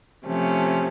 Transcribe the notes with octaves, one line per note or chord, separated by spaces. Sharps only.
C3 F3 A3 C#4